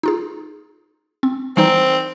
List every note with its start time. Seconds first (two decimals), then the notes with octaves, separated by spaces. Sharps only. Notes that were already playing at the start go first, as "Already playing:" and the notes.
0.03 D#4 F4 G#4
1.23 C4
1.57 E3 G3 C4 D#4